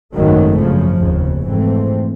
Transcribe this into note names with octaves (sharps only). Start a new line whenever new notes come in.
G#1 F#2 D#3 F#3 A3
F#2 C#3 F3
F1 D#2 C#3
G#2 E3 A3 C4